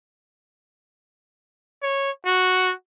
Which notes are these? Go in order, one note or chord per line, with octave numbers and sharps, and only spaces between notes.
C#5
F#4